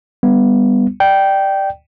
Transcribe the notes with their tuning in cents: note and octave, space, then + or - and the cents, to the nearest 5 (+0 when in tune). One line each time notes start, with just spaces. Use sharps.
G3 +15 B3 +0
D5 +15 G5 -10